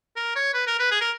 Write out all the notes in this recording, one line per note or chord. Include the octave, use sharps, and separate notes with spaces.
A#4
C#5
B4
A#4
B4
G#4
A#4